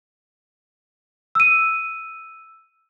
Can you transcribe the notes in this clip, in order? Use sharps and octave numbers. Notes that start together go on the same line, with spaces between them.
E6 D#7